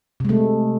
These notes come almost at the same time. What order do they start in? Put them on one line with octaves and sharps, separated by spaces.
C3 G#3 A3